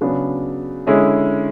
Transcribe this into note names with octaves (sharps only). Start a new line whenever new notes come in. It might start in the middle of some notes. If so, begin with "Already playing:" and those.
C#3 F#3 B3 D4
D3 G#3 C#4 E4 G#4